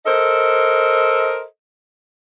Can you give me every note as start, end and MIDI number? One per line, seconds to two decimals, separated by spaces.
0.06 1.44 69
0.06 1.44 70
0.06 1.44 72
0.06 1.44 75